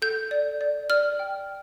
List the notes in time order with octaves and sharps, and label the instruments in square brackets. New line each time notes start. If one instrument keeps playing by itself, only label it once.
[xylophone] A4 G6
D5
D5
D5 F6
G5